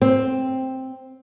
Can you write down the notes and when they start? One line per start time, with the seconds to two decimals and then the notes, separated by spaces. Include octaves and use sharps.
0.02 C4